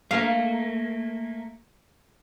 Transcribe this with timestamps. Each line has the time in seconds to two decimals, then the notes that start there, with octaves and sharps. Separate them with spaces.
0.11 A3 A#3 F5